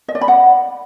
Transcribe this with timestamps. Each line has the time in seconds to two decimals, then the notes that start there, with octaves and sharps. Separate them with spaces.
0.08 D#5
0.15 D5
0.21 B5
0.28 F#5